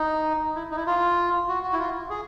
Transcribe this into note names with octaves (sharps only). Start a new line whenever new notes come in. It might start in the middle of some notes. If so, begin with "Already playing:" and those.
Already playing: D#4
E4
D#4
E4
F4
F#4
F#4
E4
F4
G#4